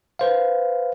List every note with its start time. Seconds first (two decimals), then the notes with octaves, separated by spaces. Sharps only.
0.19 B4 C5 F5